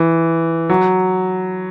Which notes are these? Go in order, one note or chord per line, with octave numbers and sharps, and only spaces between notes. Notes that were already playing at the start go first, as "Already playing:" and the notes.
Already playing: E3
F#3